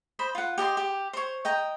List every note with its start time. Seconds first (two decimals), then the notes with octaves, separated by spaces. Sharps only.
0.19 C5 D#5 B5
0.35 F4 F#5
0.58 G4 D#5 A5 C6
0.77 G4
1.13 C5 C#5
1.45 D#5 G5 A#5